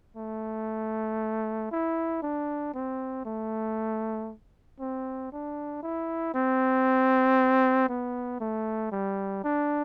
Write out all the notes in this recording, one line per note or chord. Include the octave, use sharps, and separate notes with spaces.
A3
E4
D4
C4
A3
C4
D4
E4
C4
B3
A3
G3
D4